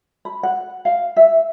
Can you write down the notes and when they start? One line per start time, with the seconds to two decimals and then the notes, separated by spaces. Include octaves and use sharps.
0.25 B5
0.43 F#5
0.85 F5
1.16 E5